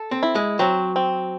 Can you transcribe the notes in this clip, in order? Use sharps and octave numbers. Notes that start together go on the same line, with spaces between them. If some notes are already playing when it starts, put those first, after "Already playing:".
Already playing: A4
C4
E4
G#3
F#3 C4
C4